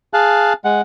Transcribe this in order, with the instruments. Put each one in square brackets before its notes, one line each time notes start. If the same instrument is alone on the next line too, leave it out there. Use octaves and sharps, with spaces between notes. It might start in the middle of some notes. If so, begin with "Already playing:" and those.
[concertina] G#4 F5 A5 F#6
G#3 F#5